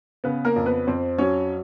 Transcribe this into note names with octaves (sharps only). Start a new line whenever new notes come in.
C#3 B3 B4
A#3 A#4
F2
B3 B4
F2 C4 C5
F#3 C#4 C#5